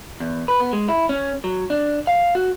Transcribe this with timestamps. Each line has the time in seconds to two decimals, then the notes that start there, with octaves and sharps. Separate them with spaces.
0.20 E2
0.48 B4
0.60 B3
0.73 G#3
0.89 E4
1.09 C#4
1.44 F#3
1.70 D4
2.07 F5
2.35 F#4